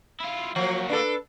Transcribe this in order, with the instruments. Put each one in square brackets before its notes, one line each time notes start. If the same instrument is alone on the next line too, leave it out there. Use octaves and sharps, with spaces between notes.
[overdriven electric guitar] E4 F4
[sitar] F3 [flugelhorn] F#3 [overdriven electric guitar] A#3 F#4
[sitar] D4 A4 [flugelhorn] B4